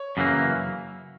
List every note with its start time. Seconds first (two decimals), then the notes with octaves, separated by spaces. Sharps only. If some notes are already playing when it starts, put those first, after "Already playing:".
Already playing: C#5
0.17 F#2 C#3 E3 A#3